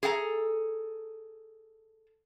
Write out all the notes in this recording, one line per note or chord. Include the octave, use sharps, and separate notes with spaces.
G#4 A4 F#5 A#5